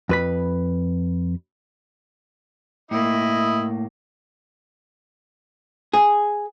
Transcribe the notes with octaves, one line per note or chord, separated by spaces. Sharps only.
F2 B4 B5
A2 A#3 E4 D#5
G#4